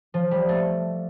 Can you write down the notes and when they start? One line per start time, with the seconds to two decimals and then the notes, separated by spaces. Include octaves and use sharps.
0.14 F3
0.31 G3
0.49 A3